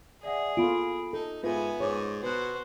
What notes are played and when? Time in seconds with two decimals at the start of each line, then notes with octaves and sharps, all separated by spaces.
0.23 G#4 D5 E5 F#5
0.57 B3 F4 A4 B5 D7
1.13 D#4 A4
1.44 G#2 B3 D#4 F4 B4 E5 G#5
1.80 G#2 C#5 C#6 D6
2.23 B2 F#4 B4 C5 F#6